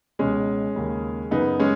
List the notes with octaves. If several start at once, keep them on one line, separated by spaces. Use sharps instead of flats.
C#2 B2 G#3 C#4
D#2 C#3
F#2 C#3 B3 D#4
G#3 C#4